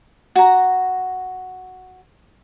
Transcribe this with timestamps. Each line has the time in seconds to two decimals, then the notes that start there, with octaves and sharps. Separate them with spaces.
0.36 F#4 A#5